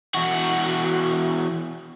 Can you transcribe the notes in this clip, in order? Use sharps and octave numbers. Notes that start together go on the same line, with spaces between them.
E2 F#4